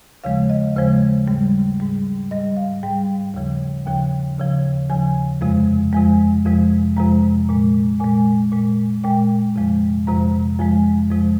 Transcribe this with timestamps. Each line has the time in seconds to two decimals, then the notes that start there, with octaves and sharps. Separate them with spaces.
0.24 D#2 C#3 F3 G#3 F5
0.50 D#5
0.77 D#2 C#3 F3 G#3 C5
1.28 G#2 G3
1.80 G#2 G3
2.31 G#2 G3 D#5
2.57 F5
2.83 G#2 G3 G5
3.34 D#2 C#3 F3
3.86 D#2 C#3 F3 G5
4.38 D#2 C#3 F3
4.90 D#2 C#3 F3 G#5
5.41 F2 C3 F3 G#3
5.93 F2 C3 F3 G#3 G#5
6.45 F2 C3 F3 G#3
6.97 F2 C3 F3 G#3 A#5
7.49 A#2 G#3
8.00 A#2 G#3 G#5
8.52 A#2 G#3
9.04 A#2 G#3 G5
9.56 F2 C3 F3 G#3
10.07 F2 C3 F3 G#3 A#5
10.59 F2 C3 F3 G#3 G#5
11.10 F2 C3 F3 G#3